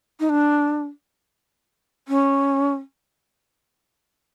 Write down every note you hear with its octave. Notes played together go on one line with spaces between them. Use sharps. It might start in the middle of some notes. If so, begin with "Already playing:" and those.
D#4
D4
C#4